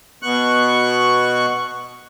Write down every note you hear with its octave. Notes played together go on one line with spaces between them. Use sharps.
B2 C#6 F#6